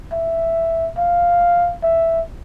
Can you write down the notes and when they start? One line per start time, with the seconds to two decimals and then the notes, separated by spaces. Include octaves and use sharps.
0.12 E5
0.97 F5
1.83 E5